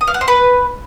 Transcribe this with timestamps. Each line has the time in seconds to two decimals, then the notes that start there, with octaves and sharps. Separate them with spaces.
0.01 D#6
0.07 F5
0.14 F#5
0.21 C5
0.28 B4